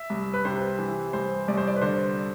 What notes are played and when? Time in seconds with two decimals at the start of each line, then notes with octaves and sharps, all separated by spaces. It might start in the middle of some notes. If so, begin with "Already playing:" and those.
Already playing: E5
0.10 C2
0.34 B4
0.45 C3 C5
0.79 E3
1.13 C2 C5
1.48 C2 D5
1.57 C5
1.67 D5
1.76 B4
1.82 D3 C5